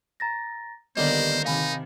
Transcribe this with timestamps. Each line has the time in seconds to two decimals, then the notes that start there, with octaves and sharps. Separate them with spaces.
0.20 A#5 A6 A#6
0.97 D#2 D3 G3 B3 A#4 C5 D5 D#5
1.45 C3 D#3 D#4 F5 G#5 B5